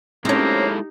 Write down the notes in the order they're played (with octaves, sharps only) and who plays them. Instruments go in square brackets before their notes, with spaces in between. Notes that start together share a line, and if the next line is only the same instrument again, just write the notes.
[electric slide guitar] G#3 E4 A4 [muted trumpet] A#3 [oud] C4 C#4 [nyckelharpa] D#4 G4